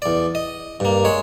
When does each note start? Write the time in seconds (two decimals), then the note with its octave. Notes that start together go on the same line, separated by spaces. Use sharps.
0.02 E2 D5
0.35 D#5
0.80 G2 A#3
1.05 G#3 C#5